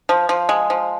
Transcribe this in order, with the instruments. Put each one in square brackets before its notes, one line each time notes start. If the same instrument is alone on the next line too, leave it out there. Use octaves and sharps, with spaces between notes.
[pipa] F3
F3
G#3
F3